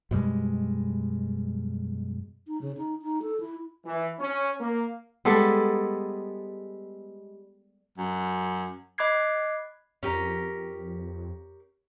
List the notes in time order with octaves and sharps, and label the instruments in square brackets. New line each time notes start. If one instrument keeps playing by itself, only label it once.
[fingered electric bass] F#2 B2 G3 G#3
[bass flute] D#4
C#3
D#4
D#4
A4
E4
[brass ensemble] E3
C#4
A#3
[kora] G3 G#3 B3 A4
[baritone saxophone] F#2
[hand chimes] D#5 B5 D6 F#6 G#6 C7
[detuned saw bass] F2 [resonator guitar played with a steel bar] C#4 G4 A#4